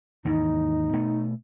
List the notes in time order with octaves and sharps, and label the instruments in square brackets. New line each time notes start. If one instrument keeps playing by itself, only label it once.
[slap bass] D#2 G#2 E3 [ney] D#4
[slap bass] B2 A3 B3